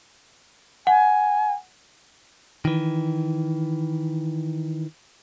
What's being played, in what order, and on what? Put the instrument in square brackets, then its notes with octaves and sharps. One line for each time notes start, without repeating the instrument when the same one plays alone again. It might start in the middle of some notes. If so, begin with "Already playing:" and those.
[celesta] F#5 [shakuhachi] G#5
[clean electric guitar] D#3 E3